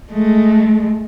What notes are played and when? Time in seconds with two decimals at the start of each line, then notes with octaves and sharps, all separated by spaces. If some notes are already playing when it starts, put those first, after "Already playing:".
0.12 G#3 A3